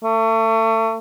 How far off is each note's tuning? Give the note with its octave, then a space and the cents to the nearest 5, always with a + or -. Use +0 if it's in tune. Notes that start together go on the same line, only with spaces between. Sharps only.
A3 +35